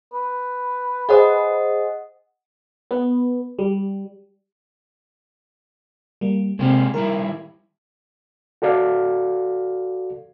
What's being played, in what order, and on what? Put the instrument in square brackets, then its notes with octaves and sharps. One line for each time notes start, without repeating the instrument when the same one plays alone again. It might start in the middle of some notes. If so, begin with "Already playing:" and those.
[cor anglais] B4
[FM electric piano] G#4 C5 [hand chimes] D#5 F#5 D#6
[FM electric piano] B3
G3
G3 A#3
[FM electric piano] C3 C4 [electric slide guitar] G#3 A#3 G4
[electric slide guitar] D#3 G3 E4 [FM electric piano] A#4
[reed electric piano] F#4 A4 D5 F5